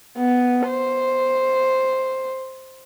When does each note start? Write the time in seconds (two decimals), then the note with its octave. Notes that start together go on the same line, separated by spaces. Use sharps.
0.18 B3
0.68 C5